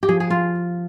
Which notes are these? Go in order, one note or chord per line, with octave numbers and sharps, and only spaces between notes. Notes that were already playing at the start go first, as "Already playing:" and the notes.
G4
F3 G#4
G#4
F3 F4